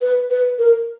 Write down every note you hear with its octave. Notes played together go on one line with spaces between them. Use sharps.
B4
B4
A#4